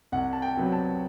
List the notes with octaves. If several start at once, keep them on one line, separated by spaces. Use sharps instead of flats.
C2 F#5
A5
G5
C3 F#3 B3
A5